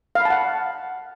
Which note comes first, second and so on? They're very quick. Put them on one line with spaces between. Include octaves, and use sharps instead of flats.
F5 B5 A5 F#5